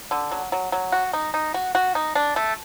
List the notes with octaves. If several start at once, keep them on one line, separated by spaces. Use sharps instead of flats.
D3
F#3
F#3
F#3
F#4
D#4
D#4
F#4
F#4
D#4
D4
A3